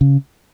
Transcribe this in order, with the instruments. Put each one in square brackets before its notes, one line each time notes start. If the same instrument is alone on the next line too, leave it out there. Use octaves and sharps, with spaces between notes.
[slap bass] C#3